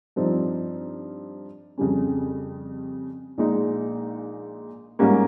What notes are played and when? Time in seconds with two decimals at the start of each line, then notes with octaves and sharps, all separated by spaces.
0.16 G2 F3 C4 D#4
1.78 F2 C#3 G3 C#4
3.38 A#1 A#2 G#3 D#4
4.99 G#2 G3 A#3 C#4